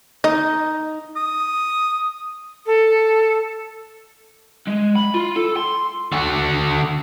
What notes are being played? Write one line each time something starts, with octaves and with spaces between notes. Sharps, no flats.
D#4 D#5
D#6
A4
G#3
B5
F4
A4
C6
D3 F#4